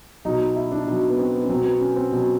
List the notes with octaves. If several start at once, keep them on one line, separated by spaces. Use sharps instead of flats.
B2 F#3 D#4
D#4
E4
D4
B2 F#3 D#4
B3
C4
B3
C#4
B2 F#3 C4
B3
C4
C#4
C4
B2 F#3